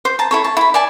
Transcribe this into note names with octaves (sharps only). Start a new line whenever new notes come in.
C5
A5 A#5
E4 A4 C#5
A5
E4 B5
D5 G#5 A5